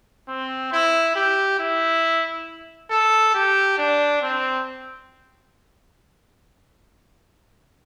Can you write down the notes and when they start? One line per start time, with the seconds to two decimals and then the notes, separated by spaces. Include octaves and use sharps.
0.28 C4
0.72 E4
1.16 G4
1.59 E4
2.90 A4
3.34 G4
3.78 D4
4.22 C4